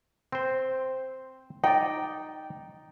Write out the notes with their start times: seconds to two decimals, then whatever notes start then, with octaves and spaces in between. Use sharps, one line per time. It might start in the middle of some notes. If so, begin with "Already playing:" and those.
0.32 C4 C5
1.64 D#4 D5 G5